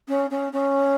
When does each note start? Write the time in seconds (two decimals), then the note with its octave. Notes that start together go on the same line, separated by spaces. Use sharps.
0.08 C#4
0.31 C#4
0.53 C#4